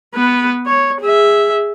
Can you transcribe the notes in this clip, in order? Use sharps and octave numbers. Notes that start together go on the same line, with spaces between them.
B3 B4
C#5
G#4 E5